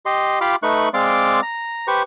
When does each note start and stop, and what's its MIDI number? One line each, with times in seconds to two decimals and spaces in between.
0.06 0.39 67
0.06 0.39 75
0.06 0.39 84
0.41 0.56 65
0.41 0.56 67
0.41 0.56 77
0.41 0.56 83
0.41 0.56 84
0.41 0.56 86
0.63 0.89 57
0.63 0.89 63
0.63 0.89 71
0.63 0.89 85
0.63 0.89 90
0.94 1.41 56
0.94 1.41 60
0.94 1.41 74
0.94 1.41 77
0.94 1.41 84
0.94 1.41 86
1.42 1.87 82
1.87 2.03 67
1.87 2.03 71
1.87 2.03 72
1.87 2.03 85